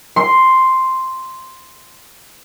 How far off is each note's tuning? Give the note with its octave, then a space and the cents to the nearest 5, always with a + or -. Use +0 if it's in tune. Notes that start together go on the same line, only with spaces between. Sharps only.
C6 +0